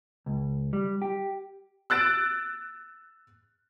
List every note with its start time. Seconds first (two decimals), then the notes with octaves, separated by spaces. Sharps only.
0.26 C#2
0.73 G3
1.02 G4
1.90 E6 F#6 A6 D7